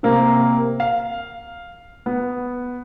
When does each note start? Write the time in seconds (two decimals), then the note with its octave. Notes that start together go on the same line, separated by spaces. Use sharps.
0.03 C3 A#3 C4
0.80 F5
2.06 B3